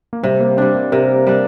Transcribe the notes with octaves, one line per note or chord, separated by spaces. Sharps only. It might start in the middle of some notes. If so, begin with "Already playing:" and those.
A#3
C3 G3
A#3
G3 C4 D4
A#3
C3 A#4
G3 D4